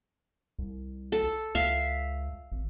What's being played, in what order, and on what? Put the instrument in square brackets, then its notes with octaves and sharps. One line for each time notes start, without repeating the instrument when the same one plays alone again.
[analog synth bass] C2
[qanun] A4
[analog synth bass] C#2 [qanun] E5 F5
[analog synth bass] G#1